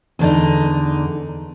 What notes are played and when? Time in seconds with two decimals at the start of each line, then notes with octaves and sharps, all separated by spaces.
0.19 E2 D3 D#4